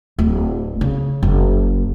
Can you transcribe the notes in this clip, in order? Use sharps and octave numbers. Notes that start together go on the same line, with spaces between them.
D1
C#3
F#1